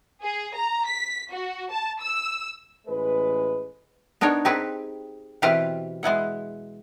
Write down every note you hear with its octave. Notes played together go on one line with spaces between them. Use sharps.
G#4
A#5
B6
F#4
A5
E6
A1 G#3 B4
B3 D4 D#4 A#4 C#5
C4 D#4 G4 G#4 B4
B2 E3 C4 G4 B4 F5
G#3 B3 E4 F#5